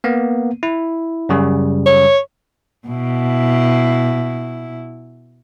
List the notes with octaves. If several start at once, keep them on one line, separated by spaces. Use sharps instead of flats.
A#3 B3
E4
F#2 C#3 G3
C#5
B2 E4